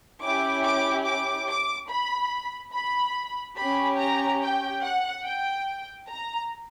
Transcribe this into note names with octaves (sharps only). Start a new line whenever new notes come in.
C#4 E4 G4 D6
D6
D6
D6
B5
B5
C#4 G4 B5
A#5
G5
F#5
G5
A#5